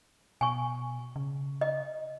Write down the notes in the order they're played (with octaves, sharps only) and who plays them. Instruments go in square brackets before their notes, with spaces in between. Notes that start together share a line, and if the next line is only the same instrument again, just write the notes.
[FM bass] B2 [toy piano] G#5 C#6
[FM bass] C#3
[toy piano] D#5